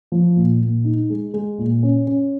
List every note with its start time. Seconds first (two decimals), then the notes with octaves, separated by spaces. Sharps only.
0.12 F3
0.36 A#2
0.61 A#2
0.85 D#4
1.10 G#3
1.34 G#3
1.58 A#2
1.83 C#4
2.07 C#4